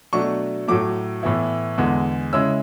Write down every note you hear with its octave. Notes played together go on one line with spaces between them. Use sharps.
B2 F#3 A3 D4 C#6
A2 F#3 A3 D6
A2 E3 B3 E4
E2 D3 G#3
C#3 G#3 C#4 E4 E6